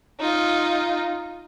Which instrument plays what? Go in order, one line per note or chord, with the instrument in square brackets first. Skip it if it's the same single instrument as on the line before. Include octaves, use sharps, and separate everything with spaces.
[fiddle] D#4 F4